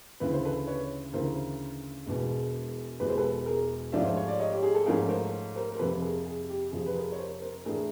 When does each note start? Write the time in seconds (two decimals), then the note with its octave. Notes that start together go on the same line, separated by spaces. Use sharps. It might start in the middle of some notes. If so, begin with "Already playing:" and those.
0.20 D2 C#3 E3 B4
0.33 C5
0.45 A4 B4
0.67 B4 C#5
1.13 D2 C#3 E3 A#4 C5
2.06 E1 E2 B2 G#3
2.99 E1 E2 B2 G#3 B4
3.09 C5
3.17 A4 B4
3.46 G#4 A#4
3.92 G#2 F3 A3 C#4 F4 D5 E5
4.05 C5
4.16 C#5
4.28 D5
4.39 C#5 D#5
4.52 G4
4.63 G#4
4.75 A4
4.86 G#2 F3 A3 C#4 F4 G#4 A#4
5.09 A#4 C5
5.56 A#4 C5
5.72 A#4
5.79 F2 C3 F3 A4 B4
6.02 G#4 A#4
6.26 G#4
6.49 G4
6.72 F2 C3 F3 G#4
6.86 B4
6.95 G#4 A#4
7.12 C#5
7.19 A#4 C5
7.41 A#4 C5
7.65 A2 E3 A3 D4 G#4 A#4